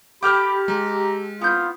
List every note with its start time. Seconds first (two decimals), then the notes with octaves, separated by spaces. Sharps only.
0.23 G4 A4 G5 B5 D6 F6 G6
0.68 G#3 A#5
1.42 B3 C4 E4 F4 G6